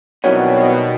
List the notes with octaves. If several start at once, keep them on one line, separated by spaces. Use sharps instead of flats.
B2 D#3 F#3 G3 B3 C4 E4 C#5